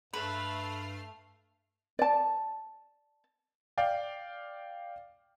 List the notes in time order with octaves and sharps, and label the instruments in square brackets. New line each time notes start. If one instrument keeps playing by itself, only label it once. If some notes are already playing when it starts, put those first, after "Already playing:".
[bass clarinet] G2 [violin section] A3 F6 C7 [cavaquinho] B4
[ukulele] D5 A5
[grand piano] D5 F5 G5